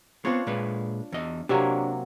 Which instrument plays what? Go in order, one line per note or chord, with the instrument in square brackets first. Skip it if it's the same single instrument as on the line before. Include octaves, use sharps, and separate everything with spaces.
[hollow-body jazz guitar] B3 C4 [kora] D4 F4 C#5
[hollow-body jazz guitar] A#2 G#3 B4
E2 D#5
[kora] C3 F#3 A#3 [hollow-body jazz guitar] D4 C#5